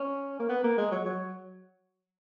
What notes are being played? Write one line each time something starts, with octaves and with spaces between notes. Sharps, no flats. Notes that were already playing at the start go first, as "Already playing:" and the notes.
Already playing: C#4
A#3
B3
A#3
G#3
F#3
F#3